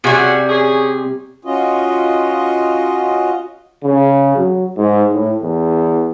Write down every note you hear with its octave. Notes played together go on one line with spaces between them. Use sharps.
C3 G3 C#4 F#4 G#4
C#4 G#4
C#4 F4 F#4 D#5
C#3
F#3
G#2
A2
E2